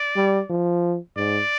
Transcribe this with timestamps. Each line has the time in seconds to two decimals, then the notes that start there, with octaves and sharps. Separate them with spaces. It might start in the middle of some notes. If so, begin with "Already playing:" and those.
Already playing: D5
0.16 G3
0.50 F3
1.17 G#2 D5